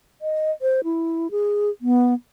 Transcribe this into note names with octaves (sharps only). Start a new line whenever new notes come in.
D#5
C5
E4
G#4
B3